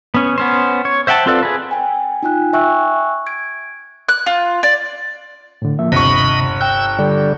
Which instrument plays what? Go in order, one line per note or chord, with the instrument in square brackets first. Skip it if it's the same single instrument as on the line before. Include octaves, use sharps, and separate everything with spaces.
[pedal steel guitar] B3 C#4
B3 C#4 C5
C#5
C5 E5 F#5 G5 A5
C4 F4 A4 B4 D5
G#4 B4
[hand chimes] G5 G#5
D#4 F4 G5 G#5 F#6
E5 G5 G#5 C#6 E6 F#6
G#6 D7
[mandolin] F#6
F4
D5
[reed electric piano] A2 D3
F3 A#3 E5
[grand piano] G1 C#6 [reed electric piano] D#2 C3 [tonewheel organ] D#5 B5
[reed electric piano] G5 F#6 [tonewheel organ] E6 G6
[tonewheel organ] D3 G3